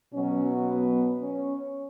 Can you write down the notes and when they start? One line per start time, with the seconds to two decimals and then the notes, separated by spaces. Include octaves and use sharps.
0.13 B2 F#3 C#4
0.67 B3
1.20 C#4